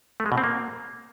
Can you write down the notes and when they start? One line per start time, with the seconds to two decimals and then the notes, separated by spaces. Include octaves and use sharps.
0.20 A3
0.26 G#3
0.32 B2
0.38 C4
0.44 A#3